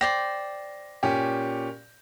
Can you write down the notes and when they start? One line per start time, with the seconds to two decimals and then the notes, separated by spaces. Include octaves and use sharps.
0.01 C5 D5 G5 A#6
1.03 A#2 C#4 G4